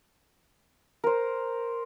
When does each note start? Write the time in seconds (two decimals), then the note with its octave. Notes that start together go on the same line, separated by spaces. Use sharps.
1.04 A#4 C5